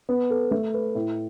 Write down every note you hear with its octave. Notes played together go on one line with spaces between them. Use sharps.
B3
A4
A3
B4
A2